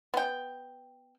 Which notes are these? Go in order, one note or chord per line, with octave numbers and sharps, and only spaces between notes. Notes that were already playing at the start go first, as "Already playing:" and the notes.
B3 G5